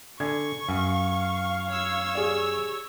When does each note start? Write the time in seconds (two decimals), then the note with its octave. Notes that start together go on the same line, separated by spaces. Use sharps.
0.20 D3 G#5 C#6 G#6
0.69 F#2 F5 G#5
1.69 C#5 E6
2.15 G4 G#4 D5